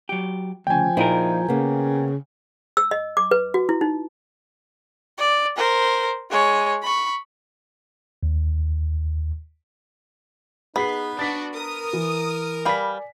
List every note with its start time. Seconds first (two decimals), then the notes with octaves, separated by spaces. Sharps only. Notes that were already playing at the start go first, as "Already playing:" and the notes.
0.09 F#3 G4
0.67 D2 C#3 F3 G5 G#5
0.97 A#2 D#4 E4 G#4 A#4 C5
1.48 C#3 A#3 B3
2.77 E6
2.91 D#5
3.17 D6
3.31 B4
3.54 F#4
3.69 E4
3.81 D#4
5.18 D5
5.56 A#4 C5
6.30 G#3 C#5
6.83 B5 C#6
8.23 D#2
10.76 B3 D#4 G#4 B4 B6 C7
11.19 D4 F#4 A6 B6
11.55 A#4 D#6
11.93 E3
12.65 G3 B4 D5 F5 G#5 B6